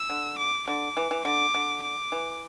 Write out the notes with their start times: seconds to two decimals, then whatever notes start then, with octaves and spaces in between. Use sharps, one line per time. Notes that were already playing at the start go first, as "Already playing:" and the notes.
Already playing: E6
0.10 D3
0.39 D6
0.68 D3 D6
0.97 E3
1.11 E3
1.25 D3 D6
1.54 D3
1.83 D6
2.12 E3